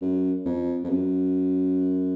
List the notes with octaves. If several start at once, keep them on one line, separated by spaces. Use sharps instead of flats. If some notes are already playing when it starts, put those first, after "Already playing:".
F#2
F2
F2
F#2